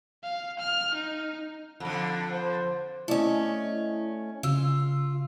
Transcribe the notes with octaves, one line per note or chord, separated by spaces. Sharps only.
F5
F6
D#4
F2 D3
C5
A3 C#4 E4 D5 D#5
C#3 F4 E6